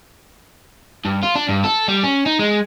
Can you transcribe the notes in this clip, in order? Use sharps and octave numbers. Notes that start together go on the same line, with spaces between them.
G2
F4
D4
G2
A4
G3
C#4
D#4
G#3